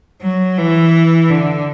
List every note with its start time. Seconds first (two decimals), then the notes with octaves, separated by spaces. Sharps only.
0.22 F#3
0.58 E3
1.31 D3